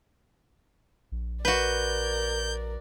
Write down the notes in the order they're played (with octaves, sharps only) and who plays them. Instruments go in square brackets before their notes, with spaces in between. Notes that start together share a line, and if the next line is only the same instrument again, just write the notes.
[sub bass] A#1
[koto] F#4 B4 [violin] A#4 D5 [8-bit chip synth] G6